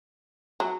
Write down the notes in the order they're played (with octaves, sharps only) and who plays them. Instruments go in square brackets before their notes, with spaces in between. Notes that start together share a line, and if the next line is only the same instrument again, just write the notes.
[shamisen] F#3